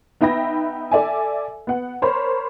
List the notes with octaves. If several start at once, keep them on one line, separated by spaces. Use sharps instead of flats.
B3 D#4 E5 G5 B5 A#6
A4 D5 E5 G#5
B3 F#5
A#4 C5 C#5 B5